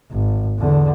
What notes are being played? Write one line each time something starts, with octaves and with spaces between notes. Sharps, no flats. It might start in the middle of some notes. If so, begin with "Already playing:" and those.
G#1
E2 D3